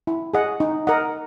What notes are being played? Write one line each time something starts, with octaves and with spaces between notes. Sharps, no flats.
E4
G#4 D#5 F#5
D#4
A#4 D#5 F#5